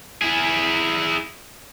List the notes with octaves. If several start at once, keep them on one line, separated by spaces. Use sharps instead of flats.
E4 G#4